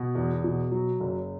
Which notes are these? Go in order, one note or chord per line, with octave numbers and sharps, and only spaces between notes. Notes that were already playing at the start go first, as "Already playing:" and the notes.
Already playing: B2
E2
B2
F#3
F#1